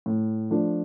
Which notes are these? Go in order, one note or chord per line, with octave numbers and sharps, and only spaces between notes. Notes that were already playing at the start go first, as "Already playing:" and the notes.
A2
F3 A3 D4